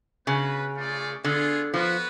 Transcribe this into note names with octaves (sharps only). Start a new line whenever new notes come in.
C#3 B3 F#4 B4
A3 F4 G#4 D5
D3 B3 F4 G#4
F3 B3 F#4 B4